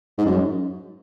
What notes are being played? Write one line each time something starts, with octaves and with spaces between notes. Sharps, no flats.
G#2
F#2